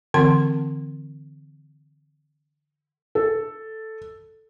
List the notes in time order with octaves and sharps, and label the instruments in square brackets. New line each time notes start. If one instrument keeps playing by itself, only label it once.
[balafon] D3 E3 C4 F#5 C6
[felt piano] A4